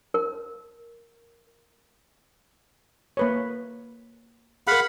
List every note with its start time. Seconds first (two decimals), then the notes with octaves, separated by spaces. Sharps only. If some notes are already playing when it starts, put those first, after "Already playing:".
0.14 A#4
3.17 A#3 B4 C#5
4.67 G#4 A#4 F5 F#5 B5